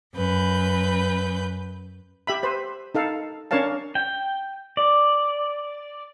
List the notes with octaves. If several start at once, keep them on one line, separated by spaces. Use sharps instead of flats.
F#2 B4 G6
G4 E5 B5
B4 C5
D#4 A4 F5
C#4 D4 A#4 C#5 F5 A5
G5
D5